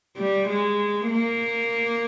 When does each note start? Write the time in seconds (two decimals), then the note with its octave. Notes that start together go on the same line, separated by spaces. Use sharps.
0.17 G3
0.48 G#3
1.10 A#3